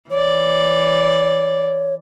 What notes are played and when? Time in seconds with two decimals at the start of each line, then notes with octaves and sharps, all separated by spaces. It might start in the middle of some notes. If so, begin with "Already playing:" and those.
0.11 E3 C#5 D5